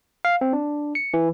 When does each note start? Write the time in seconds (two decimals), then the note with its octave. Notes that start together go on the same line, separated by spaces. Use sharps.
0.25 F5
0.41 C4
0.53 D4
0.95 C#7
1.14 E3